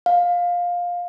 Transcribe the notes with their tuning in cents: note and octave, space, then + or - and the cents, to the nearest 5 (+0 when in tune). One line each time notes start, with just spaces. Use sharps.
F5 +15